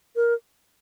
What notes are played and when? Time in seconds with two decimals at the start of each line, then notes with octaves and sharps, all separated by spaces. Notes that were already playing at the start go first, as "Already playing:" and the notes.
0.16 A#4